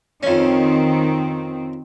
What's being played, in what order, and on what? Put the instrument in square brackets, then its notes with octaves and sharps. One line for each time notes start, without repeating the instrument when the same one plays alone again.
[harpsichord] F2 C#4 [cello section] D#3 C4